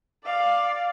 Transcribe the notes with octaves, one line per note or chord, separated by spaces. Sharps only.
D5 F5